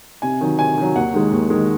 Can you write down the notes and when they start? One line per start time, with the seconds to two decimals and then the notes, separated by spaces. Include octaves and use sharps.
0.22 C3 G#5
0.41 D#3 F#3
0.59 C3 G#5
0.77 D#3 F#3
0.96 D#2 F#5
1.14 D#3 G#3
1.32 D#2
1.50 D#3 G#3